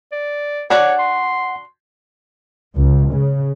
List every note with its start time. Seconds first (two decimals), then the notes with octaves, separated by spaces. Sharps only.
0.12 D5
0.70 D4 F#4 C#5 D5 F#5
0.99 C6
2.77 C#2
3.11 C#3